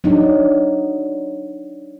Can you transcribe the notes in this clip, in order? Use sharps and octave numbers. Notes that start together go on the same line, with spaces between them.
F#3 D4 D#4